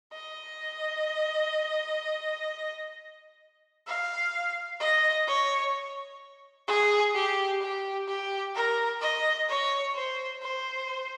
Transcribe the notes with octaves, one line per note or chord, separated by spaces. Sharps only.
D#5
F5
D#5
C#5
G#4
G4
G4
G4
A#4
D#5
C#5
C5
C5